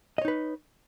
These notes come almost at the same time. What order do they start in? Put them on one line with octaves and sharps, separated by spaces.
D#5 C#5 D#4 B4